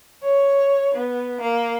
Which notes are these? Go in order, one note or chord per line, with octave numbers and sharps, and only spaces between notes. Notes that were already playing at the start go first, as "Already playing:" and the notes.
C#5
B3
A#3